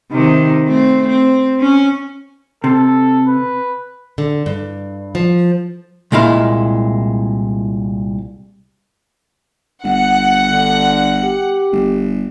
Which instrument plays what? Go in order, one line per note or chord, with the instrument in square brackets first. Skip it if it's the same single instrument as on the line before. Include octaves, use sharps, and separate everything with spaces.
[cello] C3 D#3
A3 C4
C4
C#4
[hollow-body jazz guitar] C3 [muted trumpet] A4
[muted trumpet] B4
[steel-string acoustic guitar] D3
G2
F3
[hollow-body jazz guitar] C2 A#2 G#3 E4 F5
[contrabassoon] G1 [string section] F#5
[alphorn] D3
G4
[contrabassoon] G1